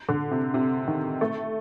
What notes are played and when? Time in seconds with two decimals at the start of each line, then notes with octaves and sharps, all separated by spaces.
0.09 D3
0.31 C3
0.54 C3
0.88 D#3
1.21 A3